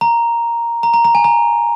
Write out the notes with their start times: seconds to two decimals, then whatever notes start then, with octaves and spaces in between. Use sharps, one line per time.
0.01 A#5
0.83 A#5
0.94 A#5
1.05 A#5
1.15 G#5
1.24 A#5